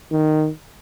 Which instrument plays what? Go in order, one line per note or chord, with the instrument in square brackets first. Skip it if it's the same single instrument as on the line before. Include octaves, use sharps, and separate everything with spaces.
[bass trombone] D#3